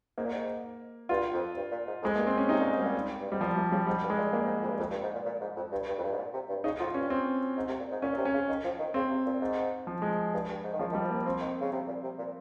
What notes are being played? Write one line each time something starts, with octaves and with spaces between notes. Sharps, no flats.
G#2 A#3
A#2
G#2
G2 F4
F2
G2
A#2
G#2
F2
G#3
G2 A#3
C4
C#4
C3 D#4
A#2 G#3
G#2
A#2 G3
G2
G#2 G3
A#2 F3
C3 G3
C#3 G3
G#2 G3
G2
G#3
A#2
A#2 A#3
G#2
F2
G2
F2
G2
G#2
A#2
A#2
G#2
F2
G2
G2
F2
G2
G#2
A#2
C3
G2
C#3 D#4
F2 F4
G2 C#4
C4
G#2
C3
A#2
G#2
A#2 C#4
A#2
C3
C#4
C#3
D#3
F3
D#3
C#3 C4
C3
A#2
G#2
F3
G#3
G2
G2
G#2
D#3
C#3 F3
D#3
G3
F3
A#3
F3
F3 C4
D#3
C#3
C3
A#2
C3
A#2